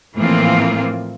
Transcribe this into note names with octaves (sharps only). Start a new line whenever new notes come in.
A2 E3 F3 A#3 C4 F4